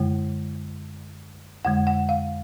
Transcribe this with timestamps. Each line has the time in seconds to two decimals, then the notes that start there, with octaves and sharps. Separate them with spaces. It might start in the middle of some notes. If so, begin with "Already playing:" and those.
Already playing: F#2 D3 G#3
1.65 F2 D3 G#3 F#5
1.87 F#5
2.09 F5